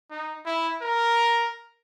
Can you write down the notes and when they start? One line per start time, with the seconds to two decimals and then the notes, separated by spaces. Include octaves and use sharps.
0.11 D#4
0.46 E4
0.81 A#4